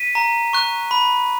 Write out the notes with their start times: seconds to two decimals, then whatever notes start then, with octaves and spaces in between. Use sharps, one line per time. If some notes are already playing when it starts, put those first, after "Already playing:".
Already playing: B6 D#7
0.15 A#5
0.53 C#6 F#6
0.91 B5